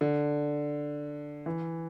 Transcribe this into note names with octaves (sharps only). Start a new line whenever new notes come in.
D3
E3